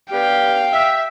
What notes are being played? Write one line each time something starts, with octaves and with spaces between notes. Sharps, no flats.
B3 D4 G4 F5 G5
E5